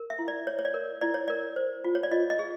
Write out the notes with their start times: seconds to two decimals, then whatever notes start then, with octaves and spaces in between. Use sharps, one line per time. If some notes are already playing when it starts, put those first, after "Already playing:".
Already playing: A#4
0.10 E5
0.19 E4
0.28 D5
0.47 C#5
0.59 C#5
0.65 D5
0.74 A#4
1.01 E4 D5
1.14 C#5
1.28 A#4 D5
1.56 C5
1.84 F4
1.95 C#5
2.03 D5
2.11 F4 D#5
2.30 D#5
2.39 G#4